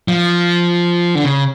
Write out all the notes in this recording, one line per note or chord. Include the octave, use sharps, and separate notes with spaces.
F3
D3
C#3